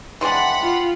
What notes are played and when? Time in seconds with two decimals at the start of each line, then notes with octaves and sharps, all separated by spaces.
0.21 E3 G#3 D4 F#5 G5 B5 C6 D6
0.62 F4